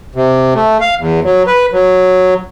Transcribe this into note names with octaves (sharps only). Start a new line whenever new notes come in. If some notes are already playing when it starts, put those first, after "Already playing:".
C3
A3
F5
E2
F#3
B4
F#3